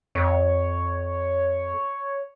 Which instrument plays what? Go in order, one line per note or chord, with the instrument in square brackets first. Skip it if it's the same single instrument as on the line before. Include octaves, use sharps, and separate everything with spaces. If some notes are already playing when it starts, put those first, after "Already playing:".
[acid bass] F2 [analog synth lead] C#5